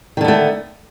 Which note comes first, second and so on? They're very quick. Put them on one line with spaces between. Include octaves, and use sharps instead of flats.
D#3 D3 B3 A3